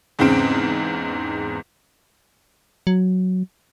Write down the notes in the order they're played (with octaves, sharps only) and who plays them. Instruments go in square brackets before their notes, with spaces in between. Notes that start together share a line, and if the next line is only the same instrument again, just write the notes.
[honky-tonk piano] E2 G#2 C#3 C4 D7
[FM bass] F#3